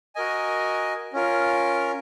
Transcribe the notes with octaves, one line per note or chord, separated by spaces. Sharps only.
F#4 A#4 D#5 G#5
C#4 F4 A#4